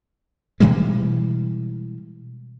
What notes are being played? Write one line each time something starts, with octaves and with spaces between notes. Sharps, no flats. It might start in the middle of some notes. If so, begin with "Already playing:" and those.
B2 E3 G3 G#3